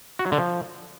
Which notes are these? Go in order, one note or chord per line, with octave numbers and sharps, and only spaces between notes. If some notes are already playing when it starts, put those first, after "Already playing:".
F#4
F#3
D3
F3